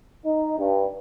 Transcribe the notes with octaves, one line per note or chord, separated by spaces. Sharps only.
D#4
G2